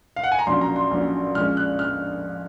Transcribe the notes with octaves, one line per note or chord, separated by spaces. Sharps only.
F5
F#5
G#5
A#5
A#1 A#2 F#3 C#4 C6
A#5
C6
A#1 A#2 F#3 C#4
A#1 A#2 G#3 C#4 F6
F#6
F6